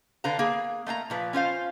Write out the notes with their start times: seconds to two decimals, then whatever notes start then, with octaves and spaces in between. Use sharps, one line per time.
0.24 D3 B4 F5 A#5
0.39 A#3 G#4
0.86 A3 A#3 F5 A#5
1.10 A#2 F3 B4
1.33 C#4 F4 C5 F5